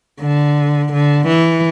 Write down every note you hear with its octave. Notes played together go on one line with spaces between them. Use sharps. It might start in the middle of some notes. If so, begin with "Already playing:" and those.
D3
D3
E3